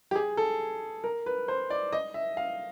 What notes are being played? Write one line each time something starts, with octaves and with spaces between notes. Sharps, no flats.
G4
G#4
A4
A#4
B4
C5
D5
D#5
E5
F5